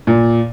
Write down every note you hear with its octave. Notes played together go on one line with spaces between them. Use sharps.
A#2